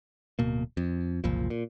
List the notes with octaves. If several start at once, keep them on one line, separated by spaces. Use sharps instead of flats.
D1 B2 A#3
F2
F#1 C2 A#2 F3
A#2